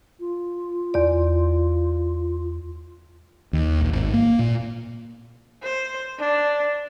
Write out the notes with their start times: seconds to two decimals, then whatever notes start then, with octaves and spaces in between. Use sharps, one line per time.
0.20 F4
0.94 E2 D5
3.53 D#2
3.81 A#1
3.93 G#1
4.13 A#3
4.39 A#2
5.63 C5
6.19 D4